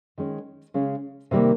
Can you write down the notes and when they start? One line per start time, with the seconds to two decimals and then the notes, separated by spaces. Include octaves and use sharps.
0.18 D#3 G#3 C#4
0.74 C#3 G#3 C#4
1.31 C3 D#3 G3 A#3